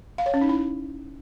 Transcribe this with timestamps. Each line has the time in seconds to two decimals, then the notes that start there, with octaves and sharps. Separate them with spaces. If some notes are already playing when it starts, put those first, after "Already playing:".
0.18 F5
0.26 C#5
0.34 C#4
0.41 D#4
0.49 E4